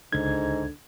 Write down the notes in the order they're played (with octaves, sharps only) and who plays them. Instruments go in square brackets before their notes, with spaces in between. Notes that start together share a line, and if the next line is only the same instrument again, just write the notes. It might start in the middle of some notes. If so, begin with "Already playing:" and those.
[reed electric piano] C#2 G#6 [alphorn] G#2 [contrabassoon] D3